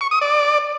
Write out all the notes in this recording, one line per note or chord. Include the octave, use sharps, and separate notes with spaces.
C#6
D#6
D5